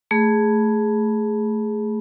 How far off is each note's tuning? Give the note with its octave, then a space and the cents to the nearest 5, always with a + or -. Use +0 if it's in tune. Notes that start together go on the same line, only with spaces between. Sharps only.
A3 +0 G#4 +0 B5 -20